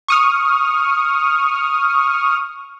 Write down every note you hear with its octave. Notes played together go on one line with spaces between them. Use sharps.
C#6 D#6 F6